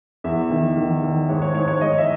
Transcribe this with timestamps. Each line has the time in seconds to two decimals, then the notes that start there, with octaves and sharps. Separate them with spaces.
0.24 E2 E5
0.50 D#3
0.77 D#3
1.03 D#3
1.29 G#2 C#5
1.42 C#5
1.55 G#2 C#5
1.68 C#5
1.81 G#2 D#5
1.98 E5